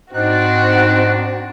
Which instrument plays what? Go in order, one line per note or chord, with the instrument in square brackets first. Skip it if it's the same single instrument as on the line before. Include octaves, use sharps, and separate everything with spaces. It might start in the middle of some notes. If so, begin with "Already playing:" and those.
[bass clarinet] G#2 [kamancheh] C4 F#4 [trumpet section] D4 [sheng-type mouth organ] D#4 F#6